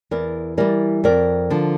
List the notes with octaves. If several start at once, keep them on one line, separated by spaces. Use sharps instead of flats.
E2 A#4 D5
E3 G3 A#4 D5
F2 A#4 D5
D3 F3